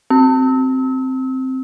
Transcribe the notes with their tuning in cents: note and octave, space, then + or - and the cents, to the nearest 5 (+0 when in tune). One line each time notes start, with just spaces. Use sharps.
C4 +0 E6 -35